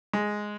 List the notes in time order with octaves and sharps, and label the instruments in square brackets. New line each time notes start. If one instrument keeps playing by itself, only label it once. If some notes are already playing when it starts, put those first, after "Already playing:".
[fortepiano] G#3